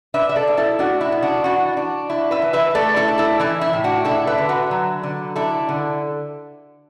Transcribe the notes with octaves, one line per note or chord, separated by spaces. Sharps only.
D4 B4 E5
E5
A4 D5
B2
E4 A4
A3 D4 F#4
E4
B2
D4 F#4
E3 D4 F#4
D4
D4 E4
B4 E5
E3
B4 E5
A3 A4 D5
E4 A4
D4
E4 A4
E3 E4
E4
A2
D4 F#4
D4 E4 A4
B4 E5
D3
F#4 B4
F#3
D3
D4 E4 A4
D3